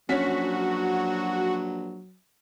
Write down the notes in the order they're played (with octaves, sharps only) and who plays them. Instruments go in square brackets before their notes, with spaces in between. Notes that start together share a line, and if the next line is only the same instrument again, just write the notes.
[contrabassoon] A#1 [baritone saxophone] F#3 [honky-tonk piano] C#4 B6 [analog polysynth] F#4